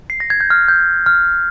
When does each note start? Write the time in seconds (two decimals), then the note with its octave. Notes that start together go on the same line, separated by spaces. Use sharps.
0.10 C7
0.20 A#6
0.30 G#6
0.41 G6
0.50 F6
0.68 G6
1.06 F6